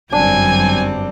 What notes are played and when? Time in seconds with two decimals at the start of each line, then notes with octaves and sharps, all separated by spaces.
0.12 G1 F#2 G3 C4 D4 G#5